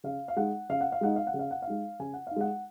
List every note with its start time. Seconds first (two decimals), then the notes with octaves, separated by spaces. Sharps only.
0.04 C#3 F5
0.28 F5
0.36 G#3 D#4 F#5
0.69 C#3 F5
0.81 F#5
0.92 F5
1.01 G#3 D#4 F#5
1.16 F5
1.27 F#5
1.34 C#3
1.39 F5
1.51 F#5
1.62 F5
1.67 G#3 D#4
1.99 C#3 G#5
2.13 F#5
2.27 D#4 F5
2.36 G#3 F#5